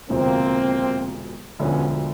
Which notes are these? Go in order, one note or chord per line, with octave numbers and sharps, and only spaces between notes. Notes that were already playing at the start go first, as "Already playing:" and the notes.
E1 D2 C3 F3 A#3 C4
E1 D2 D3 F3 B3 C#4